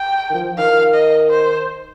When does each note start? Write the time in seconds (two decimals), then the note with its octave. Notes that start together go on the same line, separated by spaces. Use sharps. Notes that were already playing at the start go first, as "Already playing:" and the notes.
Already playing: G5
0.30 D#3
0.34 F3
0.58 D#3 F5
0.95 D#5
1.30 C5